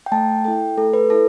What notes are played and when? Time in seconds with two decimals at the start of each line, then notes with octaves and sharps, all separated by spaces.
0.06 G5
0.12 A3 A5
0.45 E4 A4 G5
0.77 A3 A4
0.93 B4
1.10 E4 A4